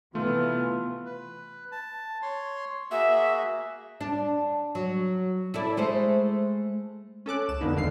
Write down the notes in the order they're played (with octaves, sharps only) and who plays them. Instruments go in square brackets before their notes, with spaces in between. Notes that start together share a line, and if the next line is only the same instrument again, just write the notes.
[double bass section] C3 E3 B3 [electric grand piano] A3 [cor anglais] F4
[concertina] B4
A5
C#5 C6
[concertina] A#3 F#4 G#4 [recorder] E5
[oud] D4
F#3
E4 A4 D5
G#3 A3 C5
[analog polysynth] C#4 A4 D6 F#6
C#2 E7
F2 D3 A#3 B3 D#4
G#1 E2 G#2 D3 F5 C7